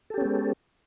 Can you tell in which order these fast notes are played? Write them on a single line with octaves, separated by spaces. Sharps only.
A4 G4 C#4 B3 G#3